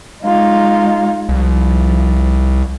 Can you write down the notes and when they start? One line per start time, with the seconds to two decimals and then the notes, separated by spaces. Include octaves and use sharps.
0.22 G#3 D#4 F4
1.29 C2 F3